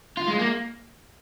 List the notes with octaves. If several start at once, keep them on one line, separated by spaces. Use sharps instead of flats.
F4
G#3
A#3